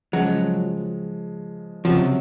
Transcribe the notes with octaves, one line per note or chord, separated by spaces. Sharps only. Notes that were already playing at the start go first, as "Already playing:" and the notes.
C#3 F3 F#3 G#3
C#2 C3 F3 F#3